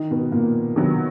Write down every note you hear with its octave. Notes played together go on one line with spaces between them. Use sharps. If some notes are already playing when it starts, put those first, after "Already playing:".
Already playing: D#3 D#4
B2 B3
A#2 A#3
C3 D#3 F#3 B3